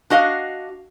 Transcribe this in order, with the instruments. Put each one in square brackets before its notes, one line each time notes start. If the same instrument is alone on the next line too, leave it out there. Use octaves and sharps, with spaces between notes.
[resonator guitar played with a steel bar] D4 F#4 D#5 F5